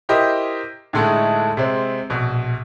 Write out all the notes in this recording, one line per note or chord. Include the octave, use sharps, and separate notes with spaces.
E4 G4 A#4 C5 D#5
A2 D3 G#3 A3 D#4 A4
C3 G#3 C4
A#1 B2